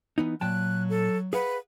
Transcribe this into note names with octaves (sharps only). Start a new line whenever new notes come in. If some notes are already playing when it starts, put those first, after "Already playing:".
E3 B3 D#4
A#2 F#3 G5 A5 F#6
A4
G#4 B4 F5 F#5